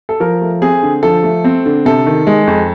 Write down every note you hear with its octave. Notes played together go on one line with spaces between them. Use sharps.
A4
F3 A#4
A3
C4 G#4
D3
F3 A4
A3
C4
D3
C3 A4
D#3
G#3
F2